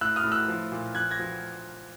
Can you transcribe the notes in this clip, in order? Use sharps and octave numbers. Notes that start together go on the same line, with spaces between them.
A2 E6 F#6
D#6 F6
A2
E6 F#6
F3
A#2
F3 F#6 G#6
G#6 A#6
F3